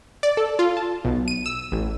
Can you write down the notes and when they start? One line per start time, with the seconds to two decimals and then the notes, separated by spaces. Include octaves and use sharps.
0.23 D5
0.37 A4
0.59 F4
0.77 A5
1.05 B1
1.28 D#7
1.46 E6
1.72 A1